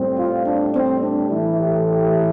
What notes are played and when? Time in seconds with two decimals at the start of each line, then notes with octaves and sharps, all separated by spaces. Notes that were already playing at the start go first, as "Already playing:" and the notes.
Already playing: A2 G3 C4
0.16 F4
0.45 D4
0.73 C4
1.02 D4
1.29 A2 E3 A3 E4
1.58 G4
1.86 G4